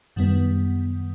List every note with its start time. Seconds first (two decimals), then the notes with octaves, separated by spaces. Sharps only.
0.16 F#2 D#3 G3 B3